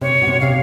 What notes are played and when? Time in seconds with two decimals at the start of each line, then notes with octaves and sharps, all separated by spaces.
0.01 C3 C#5
0.22 B2
0.27 C3
0.40 C3 F5